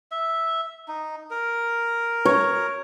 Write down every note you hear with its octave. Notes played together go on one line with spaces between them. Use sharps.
E5
D#4
A#4
C#5